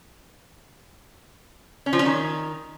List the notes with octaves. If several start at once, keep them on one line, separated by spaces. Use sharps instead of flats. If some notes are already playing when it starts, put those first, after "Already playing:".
C#4
F3
C#4
D#3